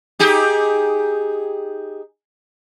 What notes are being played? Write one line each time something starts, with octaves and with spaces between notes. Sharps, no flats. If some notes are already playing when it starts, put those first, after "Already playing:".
D#4 G4 G#4